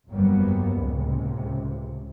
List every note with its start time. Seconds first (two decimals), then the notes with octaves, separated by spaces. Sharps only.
0.10 G1 F2 F#3 G3 A#3 B3
0.73 C#2 A2 C3